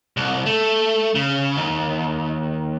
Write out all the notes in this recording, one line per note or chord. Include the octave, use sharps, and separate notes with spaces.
C2
A3
C#3
D#2